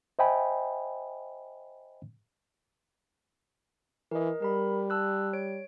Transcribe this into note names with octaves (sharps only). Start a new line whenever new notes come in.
C5 D#5 E5 G5 G#5 B5
E3 A#4 D#5
G3 A#4 B5
A5 E6 F#6
C#5 D7